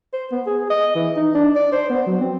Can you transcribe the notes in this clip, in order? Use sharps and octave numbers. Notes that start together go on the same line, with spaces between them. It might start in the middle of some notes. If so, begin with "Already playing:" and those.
C5
B3
G#4
D#5
E3
D#4
D4
D5
C5
B3
F#3
C4